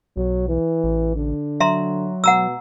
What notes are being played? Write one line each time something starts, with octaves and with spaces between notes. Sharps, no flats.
B1 F#3
E3
A1
D3
F#3 E5 A#5 C6
B2 F#5 A#5 E6